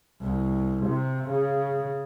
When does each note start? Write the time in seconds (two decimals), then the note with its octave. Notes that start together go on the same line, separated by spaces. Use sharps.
0.22 C2
0.87 C3
1.30 C#3